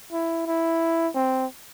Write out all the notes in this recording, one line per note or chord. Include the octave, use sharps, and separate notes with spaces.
E4
E4
C4